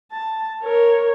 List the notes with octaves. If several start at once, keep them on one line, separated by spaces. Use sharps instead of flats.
A5
A#4 C#5